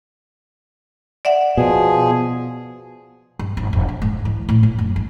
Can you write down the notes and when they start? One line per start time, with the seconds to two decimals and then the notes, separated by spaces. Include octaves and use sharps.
1.25 D5 E5 F#5
1.57 B2 F3 G#4
3.39 G2
3.57 G#1
3.73 E1
3.88 D#3
4.02 G#2
4.25 E3
4.49 A2
4.63 A#3
4.79 F#2
4.96 G#1